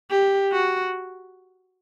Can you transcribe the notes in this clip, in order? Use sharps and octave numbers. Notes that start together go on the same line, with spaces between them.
G4
F#4